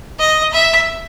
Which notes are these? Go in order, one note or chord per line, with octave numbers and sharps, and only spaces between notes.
D#5
E5